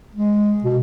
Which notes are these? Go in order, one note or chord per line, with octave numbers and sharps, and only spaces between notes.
G#3
B2